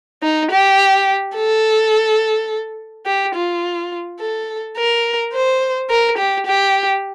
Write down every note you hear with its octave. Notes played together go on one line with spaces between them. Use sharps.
D#4
G4
A4
G4
F4
A4
A#4
C5
A#4
G4
G4